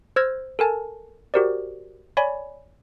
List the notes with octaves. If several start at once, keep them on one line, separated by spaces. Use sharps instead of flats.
C5 E6 F6 G#6 A#6
A4 A#4 G#5 A5
F#4 G4 A#4 C5 D5
C#5 D5 G#5 B5